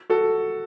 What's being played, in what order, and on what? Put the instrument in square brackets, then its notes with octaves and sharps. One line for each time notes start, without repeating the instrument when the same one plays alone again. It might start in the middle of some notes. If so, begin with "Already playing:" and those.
[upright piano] F#4 A4